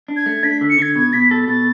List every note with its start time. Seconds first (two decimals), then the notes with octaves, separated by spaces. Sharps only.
0.08 D4
0.17 G#6
0.26 A3
0.43 D4 B6
0.61 D3
0.70 C#7
0.78 D3 G#6
0.95 B2 G#6
1.13 B2 B6
1.31 A4 A6
1.48 B2 A6